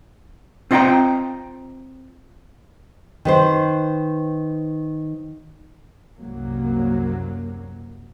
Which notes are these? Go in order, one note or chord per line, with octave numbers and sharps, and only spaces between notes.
C4 F4 D#5 F#5 G5 A#5
D#3 B4 C5
C2 F#2 F#3 A#3